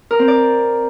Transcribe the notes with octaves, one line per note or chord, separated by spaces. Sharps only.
A#4
C4
D5